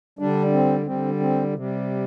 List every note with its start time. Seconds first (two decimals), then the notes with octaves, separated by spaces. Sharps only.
0.19 D3 G3 D4
0.52 C4
0.86 D3 G3 C4
1.20 C4
1.54 C3 G3